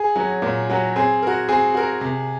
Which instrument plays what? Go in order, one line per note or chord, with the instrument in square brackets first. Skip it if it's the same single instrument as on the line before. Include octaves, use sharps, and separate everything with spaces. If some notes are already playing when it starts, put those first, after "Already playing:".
Already playing: [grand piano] G#4
[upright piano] F#3 C#4 F#4
A#2
F#3 C#4 F#4
[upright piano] C4 [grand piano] G#4
[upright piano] F#4 A#4
[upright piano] C4 [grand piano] G#4
[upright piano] F#4 A#4
C3